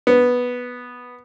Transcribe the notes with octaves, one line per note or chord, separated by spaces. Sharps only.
B3